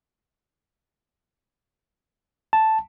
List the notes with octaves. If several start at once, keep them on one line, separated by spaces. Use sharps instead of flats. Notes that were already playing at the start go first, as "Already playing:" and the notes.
A5